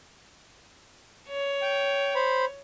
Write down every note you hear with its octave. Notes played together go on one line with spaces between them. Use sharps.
C#5
G5
C5 B5